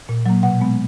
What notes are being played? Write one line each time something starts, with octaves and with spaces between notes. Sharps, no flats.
A#2
F#3 A#3
B2 F#5
G#3 B3